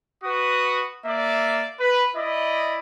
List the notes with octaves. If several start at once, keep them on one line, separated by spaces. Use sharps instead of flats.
F#4 B4 D#6
A#3 D5 E5
B4
E4 D5 D#5